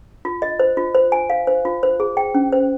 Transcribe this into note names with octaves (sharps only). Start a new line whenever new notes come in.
F4
D#5
C5
F4
C5
G#5
F5
C5
F4
C5
G#4
G5
C#4
C5